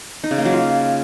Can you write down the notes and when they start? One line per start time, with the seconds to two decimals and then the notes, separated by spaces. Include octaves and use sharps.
0.24 D#4
0.31 C#3
0.38 A#3
0.45 F#3
0.53 F4